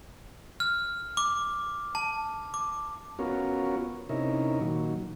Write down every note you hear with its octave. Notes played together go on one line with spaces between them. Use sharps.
F6
D6
A5
D6
B3 C#4 F4 F#4 A#4
C3 C#4 D#4 E4 A#4
A#2 D#3 F#3